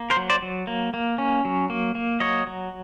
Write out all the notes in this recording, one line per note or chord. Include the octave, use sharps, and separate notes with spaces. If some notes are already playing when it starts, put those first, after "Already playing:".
Already playing: A#3
A#4 C5
F#3
C5 D5
F#3
A#3
A#3
C#4
F#3
A#3
A#3
F#3 C#5 D#5
F#3